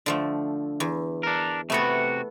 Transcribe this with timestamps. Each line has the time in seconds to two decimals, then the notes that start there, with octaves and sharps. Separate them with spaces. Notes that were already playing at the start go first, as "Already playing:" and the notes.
0.06 D3 F3 A3
0.80 E2
1.23 D4 A#4
1.70 C3 A3 B3 F#4 A4